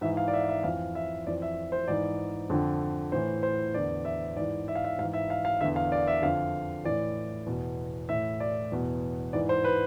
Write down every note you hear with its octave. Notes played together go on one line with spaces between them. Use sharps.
G#2 E3 E5
F5
D5
E5
E5
F2 E3 F5
E5
F2 E3 D5
E5
C5
G#2 E3 D5
F2 D3
A2 E3 C5
C5
E2 D3 D5
E5
G#2 E3 D5
E5
F5
E5
G#2 E3 F5
E5
F5
F5
E2 D3 E5
F5
D5
E5
F2 D3 F5
A2 E3 D5
E2 B2
A2 E3 E5
D5
E2 B2
G#2 E3 D5
C5
B4